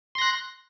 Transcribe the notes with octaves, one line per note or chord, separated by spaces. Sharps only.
C6 F#6 A#6